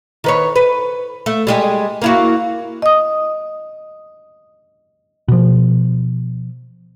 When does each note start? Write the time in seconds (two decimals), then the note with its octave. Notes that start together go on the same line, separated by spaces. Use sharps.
0.24 D#3 B4 C#5
0.56 B4
1.26 A3
1.47 G3 G#3 G4
2.02 A#3 E4 F#4
2.82 D#5 D#6
5.28 B2 F3